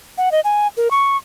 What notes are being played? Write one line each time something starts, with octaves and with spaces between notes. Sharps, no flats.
F#5
D#5
G#5
A#4
C#6